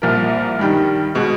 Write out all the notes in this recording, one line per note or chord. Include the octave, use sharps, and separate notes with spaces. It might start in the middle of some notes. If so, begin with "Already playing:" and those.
C2 A#2 F3 A#4
G2 D#3 G3
B2 G#3